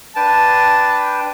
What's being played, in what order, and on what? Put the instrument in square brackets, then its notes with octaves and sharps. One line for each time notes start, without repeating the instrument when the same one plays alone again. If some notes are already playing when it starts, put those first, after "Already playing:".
[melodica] D4 B4 G5 [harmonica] A5